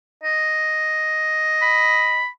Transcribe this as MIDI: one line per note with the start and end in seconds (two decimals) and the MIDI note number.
0.24 2.20 75
1.62 2.27 83